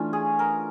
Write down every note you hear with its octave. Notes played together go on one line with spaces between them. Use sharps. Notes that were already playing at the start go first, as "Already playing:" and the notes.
Already playing: E3 A3 C#4 D4 F4
G#4
A#4